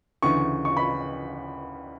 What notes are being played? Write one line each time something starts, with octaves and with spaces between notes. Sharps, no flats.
D2 C#3 E3 C#6
C#6
B5